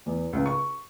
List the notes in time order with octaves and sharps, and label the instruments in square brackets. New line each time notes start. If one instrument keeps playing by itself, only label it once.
[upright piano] E2
C#2
C#6